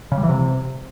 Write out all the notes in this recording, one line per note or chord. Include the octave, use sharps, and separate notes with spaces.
C#3
G3
E3
C3